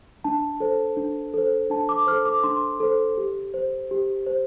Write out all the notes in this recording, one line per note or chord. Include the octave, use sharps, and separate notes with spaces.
D4 A5
A4 C5
D4
A4 C5
D4 A5
D6
A4 C5 F6
D6
D4 C6
A4 C5
G4
C5
G4
C5